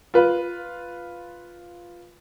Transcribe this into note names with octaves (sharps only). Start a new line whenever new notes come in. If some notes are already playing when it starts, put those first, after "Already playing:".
F4 B4